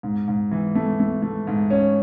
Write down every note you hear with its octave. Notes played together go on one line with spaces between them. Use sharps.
G#2
G#2
E3
A3
A3
A3
G#2
C#4